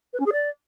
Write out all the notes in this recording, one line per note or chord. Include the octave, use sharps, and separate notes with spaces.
B4
C#4
G#4
D5